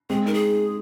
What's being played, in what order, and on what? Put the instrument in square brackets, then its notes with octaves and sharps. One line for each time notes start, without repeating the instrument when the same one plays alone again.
[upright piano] G#3 C4 [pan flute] G#4
[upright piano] C4 D#4 [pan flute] A#4
[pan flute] G#4